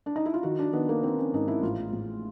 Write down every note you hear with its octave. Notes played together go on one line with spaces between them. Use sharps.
D4
D#4
E4
F4
D#3 F#4
D4
D#3 B3
A#3
D#3 C4
C#4
G#2 D#4
E4
A1 F4
A1